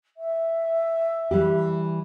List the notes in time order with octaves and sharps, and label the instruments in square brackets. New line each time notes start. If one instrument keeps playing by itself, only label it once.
[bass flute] E5
[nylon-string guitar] E3 G3 G4